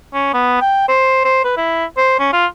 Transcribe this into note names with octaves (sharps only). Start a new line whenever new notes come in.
C#4
B3
G5
C5
C5
B4
E4
C5
C#4
F4